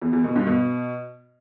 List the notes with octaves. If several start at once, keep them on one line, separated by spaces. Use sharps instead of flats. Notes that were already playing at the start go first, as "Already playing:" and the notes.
E2
E2
B2
G2
B2